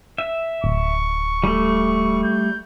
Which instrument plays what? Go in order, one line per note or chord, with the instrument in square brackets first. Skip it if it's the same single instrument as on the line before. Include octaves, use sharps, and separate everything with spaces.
[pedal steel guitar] E5
[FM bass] D1 [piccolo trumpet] C#6
[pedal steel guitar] G3 A3
[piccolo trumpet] G6